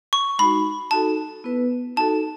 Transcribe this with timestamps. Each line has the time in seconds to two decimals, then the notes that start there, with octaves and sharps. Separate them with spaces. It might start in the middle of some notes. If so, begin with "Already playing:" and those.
0.13 C#6
0.39 G#3 D#4 F#4 B5
0.91 D#4 F#4 A4 A5
1.44 B3 E4 B4
1.97 D#4 F#4 A4 A5